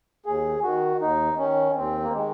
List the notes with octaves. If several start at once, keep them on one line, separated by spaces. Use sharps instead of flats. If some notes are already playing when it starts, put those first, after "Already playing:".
D#2 G#4
D#3 F#4
D#2 D#4
D#3 C#4
D#2 C4
A#3
D#3 G#3